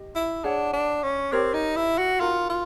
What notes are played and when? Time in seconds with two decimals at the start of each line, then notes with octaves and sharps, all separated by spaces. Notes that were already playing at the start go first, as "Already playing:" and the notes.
Already playing: G4 D#5
0.15 E4
0.44 D4 G#4 C#5 F#5
0.73 D4
1.03 C#4
1.32 C4 G4 A#4 C#5
1.54 D#4
1.76 E4
1.98 F#4
2.20 D#4 F4 F#4 A#4
2.50 F4